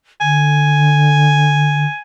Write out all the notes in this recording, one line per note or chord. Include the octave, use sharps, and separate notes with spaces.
D3 G#5